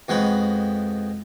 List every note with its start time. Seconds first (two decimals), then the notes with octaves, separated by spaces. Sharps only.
0.08 F2 B2 G#3 G5 B5